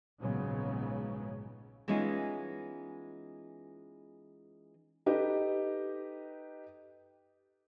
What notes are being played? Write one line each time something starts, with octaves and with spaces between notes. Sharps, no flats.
A#1 G#2 C#3 F#3 G#3 B3
E3 G#3 B3 C#4 D#4 F4
D#4 G4 A4 B4 D#5